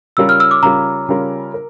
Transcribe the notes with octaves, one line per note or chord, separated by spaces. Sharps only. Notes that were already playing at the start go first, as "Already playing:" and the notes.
C#3 G3 C#4 F4 A#4 E6
F6
E6
D6
C#3 G3 C#4 F4 A#4 A#5
C#3 G3 C#4 F4 A#4
A#4